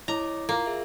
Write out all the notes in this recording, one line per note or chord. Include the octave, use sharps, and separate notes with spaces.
E4 C#5 D#5 A#5 D6
A#3 F4 A#5
G#4 E5